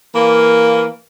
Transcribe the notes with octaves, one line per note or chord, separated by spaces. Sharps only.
E3 A#3